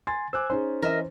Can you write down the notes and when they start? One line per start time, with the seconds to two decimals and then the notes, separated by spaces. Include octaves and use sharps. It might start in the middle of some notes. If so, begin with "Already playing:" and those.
0.07 G#5 C6 A6
0.33 C5 G#5 D6 E6 F#6
0.50 C#4 D#4 G#4 C5
0.82 E3 C#4 A#4 D#5 E5